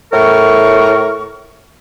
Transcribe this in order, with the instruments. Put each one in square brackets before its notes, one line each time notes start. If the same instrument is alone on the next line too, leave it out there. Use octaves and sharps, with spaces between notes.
[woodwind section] A2 A#4 C#6